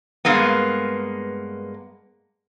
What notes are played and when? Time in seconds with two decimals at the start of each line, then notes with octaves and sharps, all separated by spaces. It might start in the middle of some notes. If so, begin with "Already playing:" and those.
0.25 G2 G#3 A#3 B3